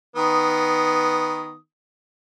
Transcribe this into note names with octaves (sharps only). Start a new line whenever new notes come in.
D#3 B3 D#6